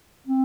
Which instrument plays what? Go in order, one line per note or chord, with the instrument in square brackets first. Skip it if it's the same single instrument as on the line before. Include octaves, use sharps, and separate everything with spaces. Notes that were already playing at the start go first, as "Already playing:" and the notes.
[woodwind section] C4